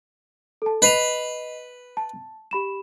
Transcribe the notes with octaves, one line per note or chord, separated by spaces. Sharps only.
A4 A5
B4 D#5 C7 F7
A5
G4 B5 E7